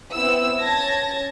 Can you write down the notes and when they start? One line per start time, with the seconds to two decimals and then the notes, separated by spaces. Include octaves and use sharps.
0.12 B3 C4 E4 E6
0.60 C#4 A5 G#6 A#6